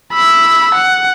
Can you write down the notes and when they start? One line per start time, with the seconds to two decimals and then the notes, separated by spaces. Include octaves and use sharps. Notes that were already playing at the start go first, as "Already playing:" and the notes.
0.13 B5 E6
0.74 F#5